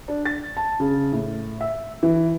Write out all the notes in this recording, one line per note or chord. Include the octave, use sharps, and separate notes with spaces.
D4
A6
A5
C#3
A2
E5
E3